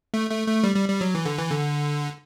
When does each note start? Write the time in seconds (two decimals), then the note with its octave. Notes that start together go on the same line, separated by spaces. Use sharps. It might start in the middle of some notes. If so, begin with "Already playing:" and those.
0.14 A3
0.30 A3
0.48 A3
0.64 G3
0.76 G3
0.89 G3
1.01 F#3
1.15 E3
1.25 D3
1.38 E3
1.50 D3